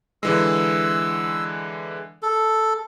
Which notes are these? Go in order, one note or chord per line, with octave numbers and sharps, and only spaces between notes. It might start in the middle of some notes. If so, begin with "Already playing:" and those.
D3 E3 G#3 E6
A4